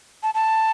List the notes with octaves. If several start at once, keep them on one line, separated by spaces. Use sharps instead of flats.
A5
A5